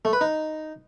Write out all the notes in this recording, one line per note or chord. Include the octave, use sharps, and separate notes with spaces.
A3
B4
D#4